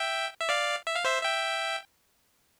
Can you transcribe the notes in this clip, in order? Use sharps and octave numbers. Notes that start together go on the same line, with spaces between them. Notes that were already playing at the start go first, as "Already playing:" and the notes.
Already playing: E5 G5
E5
D5 F5
E5
F5
C5 E5
E5 G5